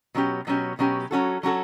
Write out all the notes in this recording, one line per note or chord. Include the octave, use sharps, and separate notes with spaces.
B2 F#3 C#4 G4
B2 F#3 C#4 G4
B2 F#3 C#4 G4
F#3 C#4 F#4 A4
F#3 C#4 F#4 A4